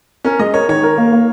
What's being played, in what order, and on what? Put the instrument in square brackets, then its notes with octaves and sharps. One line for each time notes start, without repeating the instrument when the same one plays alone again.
[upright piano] C#4 [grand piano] A#4
[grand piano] G#3 [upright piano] D#5
[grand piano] A#4 [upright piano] C#5
[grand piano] D#3 [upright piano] C#5
[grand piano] A#4
A#3
A#3